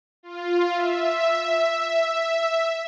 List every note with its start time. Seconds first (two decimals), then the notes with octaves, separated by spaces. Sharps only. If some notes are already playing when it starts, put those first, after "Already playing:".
0.23 F4
0.74 E5